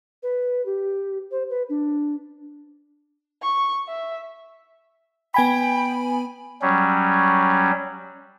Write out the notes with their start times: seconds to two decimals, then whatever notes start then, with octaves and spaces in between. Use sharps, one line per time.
0.23 B4
0.66 G4
1.31 C5
1.50 B4
1.69 D4
3.43 C#6
3.88 E5
5.34 B3 G5 G#5 B5
6.62 F#3 G3 C#4